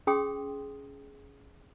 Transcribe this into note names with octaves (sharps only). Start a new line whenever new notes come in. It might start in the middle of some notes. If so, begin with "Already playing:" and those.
C#4 G#4 G5 C6 D#6